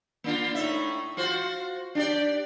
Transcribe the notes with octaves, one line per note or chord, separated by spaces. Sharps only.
A#3 D4 F4
A2 D#4 E5
F4 F#4 C5
D4 G4 D5